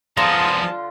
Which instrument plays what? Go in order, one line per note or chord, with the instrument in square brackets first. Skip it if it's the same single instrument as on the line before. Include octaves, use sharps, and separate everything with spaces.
[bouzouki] D3 F4 [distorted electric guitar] F3 B3 [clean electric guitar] G#4 A#5 [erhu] A5